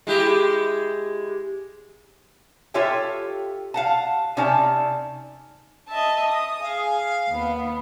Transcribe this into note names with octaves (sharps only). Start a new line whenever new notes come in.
G#3 E4 G4
F4 G4 A4 C#5 E5 G5
F5 F#5 A5
C3 C#4 D#4 D5 A5
D#5 E5 A5
D#6
G#4 F5
D#2 B3